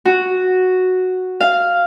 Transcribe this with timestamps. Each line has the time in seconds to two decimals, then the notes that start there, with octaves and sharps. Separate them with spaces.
0.05 F#4
1.40 F5